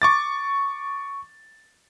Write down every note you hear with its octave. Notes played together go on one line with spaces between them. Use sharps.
C#6 D6 A6